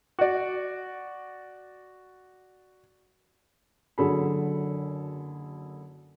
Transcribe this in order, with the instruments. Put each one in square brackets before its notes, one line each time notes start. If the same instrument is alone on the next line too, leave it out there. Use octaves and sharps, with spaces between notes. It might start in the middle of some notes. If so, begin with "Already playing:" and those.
[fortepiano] F#4 D5
[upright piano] F#1 D3 F#3 G#4 A4 B5